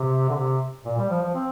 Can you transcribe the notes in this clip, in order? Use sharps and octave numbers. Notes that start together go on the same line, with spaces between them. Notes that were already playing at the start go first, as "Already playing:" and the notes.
Already playing: C3
D3
C3
A#2
G3
F3
F3
C4